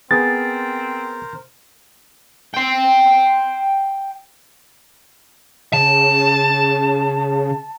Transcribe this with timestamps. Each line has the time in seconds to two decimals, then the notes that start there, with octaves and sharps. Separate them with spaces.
0.11 B3 C4 G#4 A#4 C5 A6
2.54 G5 C6
5.73 C#3 A5